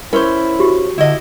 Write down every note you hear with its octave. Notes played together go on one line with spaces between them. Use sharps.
C#4 E4 A#4 C5
F#4 G4
D3 E4 D#5